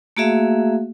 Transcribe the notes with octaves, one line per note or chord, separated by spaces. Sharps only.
A3 A#3 F#4 G#4 E5 F5